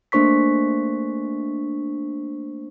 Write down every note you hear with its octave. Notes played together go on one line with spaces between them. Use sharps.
A3 A#3 D4 C5 C#6 B6